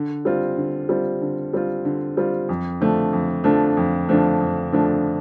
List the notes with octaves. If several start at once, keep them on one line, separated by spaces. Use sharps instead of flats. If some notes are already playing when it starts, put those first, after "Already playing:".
Already playing: D3
G3 C4 F4
D3
G3 C4 F4
D3
G3 C4 F4
D3
G3 C4 F4
F2
D3 F3 A3 D4
F2
D3 F3 A3 D4
F2
D3 F3 A3 D4
F2
D3 F3 A3 D4